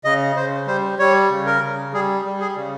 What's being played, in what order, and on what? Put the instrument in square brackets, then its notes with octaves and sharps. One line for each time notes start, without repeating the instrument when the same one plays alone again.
[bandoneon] C#3 D#5
C#3 C5
G3 C5
G3 C#5
C#3
A#4
C#3
G3 G#4
G3
G#4
C#3